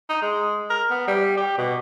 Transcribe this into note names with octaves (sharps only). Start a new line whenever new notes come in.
D#4
G#3
A#4
B3
G3
G4
B2